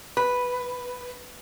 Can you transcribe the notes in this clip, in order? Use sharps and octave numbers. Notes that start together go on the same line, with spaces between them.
B4